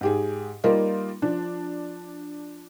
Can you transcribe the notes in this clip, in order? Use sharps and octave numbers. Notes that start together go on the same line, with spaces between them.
G#2 G4 G#4
G3 A#3 D#4 F4 A#4
F3 D4